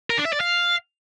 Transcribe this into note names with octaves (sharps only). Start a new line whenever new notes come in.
A#4
D4
E5
D5
F5